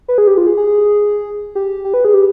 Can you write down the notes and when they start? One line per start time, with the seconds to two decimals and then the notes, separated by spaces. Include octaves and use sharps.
0.08 B4
0.18 G#4
0.27 G4
0.37 F4
0.47 G#4
0.57 G#4
1.55 G4
1.85 G4
1.94 B4
2.05 G#4
2.14 G4